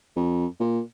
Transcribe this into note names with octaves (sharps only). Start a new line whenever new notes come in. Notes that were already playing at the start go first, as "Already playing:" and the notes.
F2
A#2